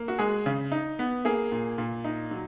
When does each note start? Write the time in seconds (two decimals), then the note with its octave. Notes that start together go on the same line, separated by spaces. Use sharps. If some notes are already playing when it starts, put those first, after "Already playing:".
Already playing: A#3
0.08 F#4
0.19 G#3 G#4
0.46 C#3
0.72 D#4
0.99 B3
1.25 A#3 G#4
1.52 A#2
1.78 A#2
2.04 D#4
2.31 F#3